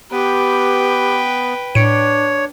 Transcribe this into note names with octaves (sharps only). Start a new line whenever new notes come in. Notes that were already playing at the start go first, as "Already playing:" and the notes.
B3 G4 B4 G5
A2 D4 C#5 C#7 D7